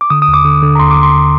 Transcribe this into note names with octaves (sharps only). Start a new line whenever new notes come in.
D6
D3 D#6
D#6
D#2
D6
D3
D3
A#5
D#2 C6
D6
D3
C6